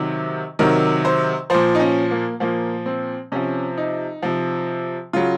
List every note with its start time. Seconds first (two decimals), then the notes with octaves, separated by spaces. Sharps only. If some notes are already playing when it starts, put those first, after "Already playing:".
Already playing: C3 D#3 F#3
0.59 C3 D#3 F#3 A#4
1.05 C5
1.50 A#2 F3 C5
1.75 D#4
1.80 C#4
2.11 A#3
2.40 A#2 F3 A#3
2.86 C4
3.32 C3 F3 C#4
3.78 D#4
4.22 C3 F3
5.13 C#3 F#3 F4